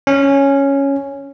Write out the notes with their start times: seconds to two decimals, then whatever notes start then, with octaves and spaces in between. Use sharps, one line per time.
0.07 C#4